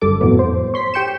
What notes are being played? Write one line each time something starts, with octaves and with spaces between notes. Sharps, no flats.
G1 F#2 G3 A4 D6
F2 A2 E3 F#3 B3
C5
C#5 C6 B6
G4 G5 G6 C#7 E7